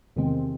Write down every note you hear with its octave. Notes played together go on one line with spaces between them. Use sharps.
E2 C3 D#3 G#3 C4